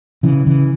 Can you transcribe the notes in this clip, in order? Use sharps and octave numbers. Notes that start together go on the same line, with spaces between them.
C#3 E3
C#3 E3